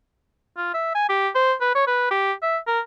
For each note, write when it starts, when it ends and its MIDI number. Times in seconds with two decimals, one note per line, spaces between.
0.57 0.71 65
0.74 0.92 76
0.95 1.06 80
1.09 1.29 67
1.35 1.53 72
1.61 1.73 71
1.75 1.86 73
1.87 2.07 71
2.11 2.33 67
2.43 2.58 76
2.67 2.80 70